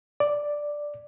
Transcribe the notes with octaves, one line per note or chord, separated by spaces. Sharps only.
D5